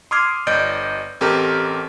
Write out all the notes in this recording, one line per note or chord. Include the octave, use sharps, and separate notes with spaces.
C6 D6 D#6 F6 G#6 C7
G1 D5 D#5 G6 D7
A1 C4 G4 A4 A#4